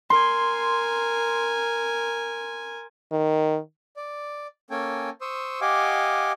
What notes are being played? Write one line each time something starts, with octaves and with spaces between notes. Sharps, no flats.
A#4 G#5 C6
D#3
D5
A#3 C#4 A4 G5 G#5
C5 C#6 D#6 E6
G4 D#5 F5 F#5 G#5 D6